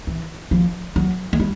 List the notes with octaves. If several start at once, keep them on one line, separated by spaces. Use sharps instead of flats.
E3
F3
F#3
G#3
G3